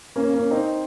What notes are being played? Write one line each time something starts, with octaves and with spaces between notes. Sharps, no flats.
A#3 C#4
A#3 C#4
C4 D#4